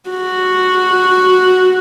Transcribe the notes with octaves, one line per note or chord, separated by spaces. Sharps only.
F#4